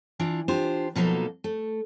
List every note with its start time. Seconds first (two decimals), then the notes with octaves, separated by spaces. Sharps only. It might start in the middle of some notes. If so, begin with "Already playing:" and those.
0.20 E3 D4 F4
0.48 D4 F4 G4 C5
0.95 B2 F3 F#3 A#3 D#4 A4
1.44 A3